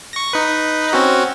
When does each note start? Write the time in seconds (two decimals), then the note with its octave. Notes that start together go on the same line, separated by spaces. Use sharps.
0.13 C#6 A#6
0.33 D#4 B4
0.93 C4 C#4 F#4